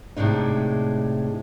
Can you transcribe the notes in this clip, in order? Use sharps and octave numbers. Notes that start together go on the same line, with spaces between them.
A2 C3 G#3 D4 D#4